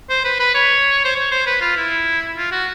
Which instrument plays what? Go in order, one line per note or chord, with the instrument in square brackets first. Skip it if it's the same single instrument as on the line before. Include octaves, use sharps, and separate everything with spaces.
[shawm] C5
B4
B4
C#5
C5
C#5
C5
B4
F4
E4
F4
F#4